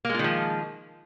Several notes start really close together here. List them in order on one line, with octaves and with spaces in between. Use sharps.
A#3 G#3 F4 D#3 F3